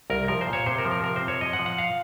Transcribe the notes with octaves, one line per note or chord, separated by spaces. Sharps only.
C2 A#4
F3 A#4
C5
A#2
C#5
C3 C5
A#4
F3
A#4
C3 A#4
C5
C4
C#5
F3 D#5
F#5
F3
F#5
F5